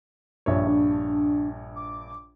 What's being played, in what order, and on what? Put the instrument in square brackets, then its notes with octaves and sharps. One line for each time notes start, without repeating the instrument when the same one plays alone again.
[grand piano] A#1 G2 C#5 [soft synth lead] E5
[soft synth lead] D4
D6